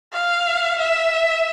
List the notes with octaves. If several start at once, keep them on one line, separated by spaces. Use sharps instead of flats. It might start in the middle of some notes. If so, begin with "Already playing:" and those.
F5
E5